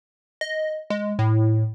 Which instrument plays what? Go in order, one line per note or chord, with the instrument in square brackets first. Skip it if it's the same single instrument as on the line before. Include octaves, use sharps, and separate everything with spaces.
[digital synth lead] D#5
G#3
A2